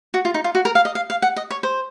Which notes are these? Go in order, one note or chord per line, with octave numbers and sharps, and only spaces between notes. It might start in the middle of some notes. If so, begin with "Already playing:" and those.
F#4
F4
D#4
F4
F#4
A#4
F5
D#5
F5
F5
F#5
D#5
C#5
C5